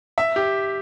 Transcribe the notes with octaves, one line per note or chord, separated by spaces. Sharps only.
E5
G4